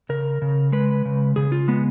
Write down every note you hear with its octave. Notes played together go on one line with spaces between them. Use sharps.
C#3 A#4
C#3
G#3 B4
C#3
C#3 G#4
F4
G#3 B3